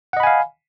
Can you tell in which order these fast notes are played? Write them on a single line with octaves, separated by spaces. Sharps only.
F#5 D#5 B5 G#5 F5